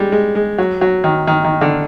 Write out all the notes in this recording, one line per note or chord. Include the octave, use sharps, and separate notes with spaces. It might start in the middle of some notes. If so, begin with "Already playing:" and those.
Already playing: G3 G#3
G#3
G#3
F#3
F#3
D#3
D#3
D#3
D3